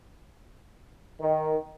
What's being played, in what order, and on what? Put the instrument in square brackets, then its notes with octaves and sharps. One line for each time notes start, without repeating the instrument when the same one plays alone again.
[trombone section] D#3